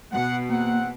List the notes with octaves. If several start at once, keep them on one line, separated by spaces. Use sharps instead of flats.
B2 F#5
E2 A#3 C4 F#5